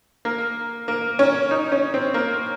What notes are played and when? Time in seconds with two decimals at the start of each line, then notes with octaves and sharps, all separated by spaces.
0.25 A#3
0.88 A#3
1.19 C#4
1.51 D#4
1.72 C#4
1.94 C4
2.14 A#3